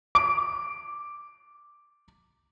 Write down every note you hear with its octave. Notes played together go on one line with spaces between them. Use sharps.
D6 D7